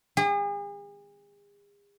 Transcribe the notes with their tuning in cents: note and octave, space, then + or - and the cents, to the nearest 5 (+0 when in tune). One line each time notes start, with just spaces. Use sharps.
G#4 -40